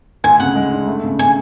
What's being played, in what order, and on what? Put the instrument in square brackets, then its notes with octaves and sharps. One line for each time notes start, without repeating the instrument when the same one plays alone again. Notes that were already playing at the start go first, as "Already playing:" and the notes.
[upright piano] D2 [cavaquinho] G#5
[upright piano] C#3 [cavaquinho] F#5
[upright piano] G#3
D4
A3
C#3
[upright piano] C#3 [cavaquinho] G#5